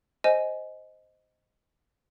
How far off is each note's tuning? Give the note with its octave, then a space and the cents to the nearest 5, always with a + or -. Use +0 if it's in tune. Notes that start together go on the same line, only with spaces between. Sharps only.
C5 +0 D#5 +0 G#5 +15